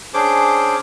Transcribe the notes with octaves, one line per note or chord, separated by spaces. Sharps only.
C#4 D4 G#4 C5 D6